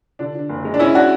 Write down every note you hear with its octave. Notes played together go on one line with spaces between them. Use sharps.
D3 D4
D3
F#1
G#3
D4
G#3 C#4 E4
D4 F#4